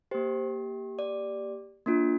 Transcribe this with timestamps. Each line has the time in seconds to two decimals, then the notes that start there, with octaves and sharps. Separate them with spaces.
0.11 A#3 G4 C5
0.99 D5
1.86 A#3 D4 F4